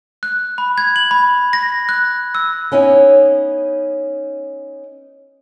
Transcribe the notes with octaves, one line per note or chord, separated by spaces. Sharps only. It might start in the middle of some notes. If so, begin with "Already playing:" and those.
F#6
B5
G#6
F#7
B5
A#6
F#6
E6
B3 C#4 D#4 E4 C#5